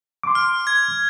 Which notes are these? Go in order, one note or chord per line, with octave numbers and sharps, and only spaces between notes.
C6 D6
F6
G#6